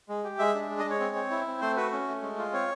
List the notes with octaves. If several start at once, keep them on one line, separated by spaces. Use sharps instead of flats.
G#3
G4
G#3 E5
D4
G#3
D#5
G#3
C#5
C4
C4
E4
C4
A3 C5
F#4 B4
C#4
A3
G#3
F4
C4 C#5